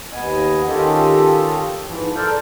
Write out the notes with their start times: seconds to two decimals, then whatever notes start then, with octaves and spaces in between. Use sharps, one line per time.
0.12 D#2 B3 D#5 G#5
0.69 D#3 C#4 F4 G4 A4 D#5
1.86 G#2 E3 F3
2.16 A4 A#4 C5 D5